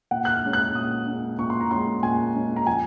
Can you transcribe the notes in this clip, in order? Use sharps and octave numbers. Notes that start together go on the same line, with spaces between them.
A#2 F#5
F#6
F6
G#3 C#4
F#6
A#2 D#6
G#3 C#4
A#2 C#6
C6
A#5
G#3 C#4 C6
A#2 G#5
G#3 C#4
A#5
F3 G#5